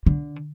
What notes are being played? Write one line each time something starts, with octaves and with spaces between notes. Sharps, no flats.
D3